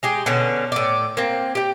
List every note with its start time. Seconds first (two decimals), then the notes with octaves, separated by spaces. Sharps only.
0.03 G#3 G4 G#4
0.26 B2 D3 C#4
0.72 A2 D5
1.17 A#3 C4
1.55 G4 G5